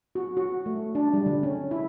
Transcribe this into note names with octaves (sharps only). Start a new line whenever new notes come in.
F#4
F#4
A3
D4
G3
D3
C#4
E4